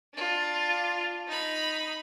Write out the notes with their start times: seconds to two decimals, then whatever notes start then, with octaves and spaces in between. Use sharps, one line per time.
0.14 D4 F4
1.27 D#4 B5